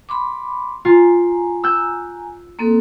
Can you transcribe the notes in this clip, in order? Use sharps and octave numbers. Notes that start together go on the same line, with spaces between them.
B5 C6 D6
F4 G#5 A#5
E6 F#6 G6
A#3 C4 A4